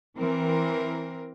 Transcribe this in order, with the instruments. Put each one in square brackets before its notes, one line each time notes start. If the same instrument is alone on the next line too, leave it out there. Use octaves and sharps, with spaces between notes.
[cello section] E3 C4 A#4